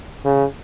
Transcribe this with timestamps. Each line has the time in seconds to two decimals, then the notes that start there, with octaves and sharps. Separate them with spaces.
0.25 C#3